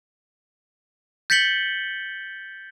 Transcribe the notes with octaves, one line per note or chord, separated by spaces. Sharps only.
G6 A6 B6 C#7 F#7 G7